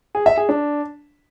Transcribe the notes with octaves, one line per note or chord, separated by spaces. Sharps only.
G#4
E5
G#4
D4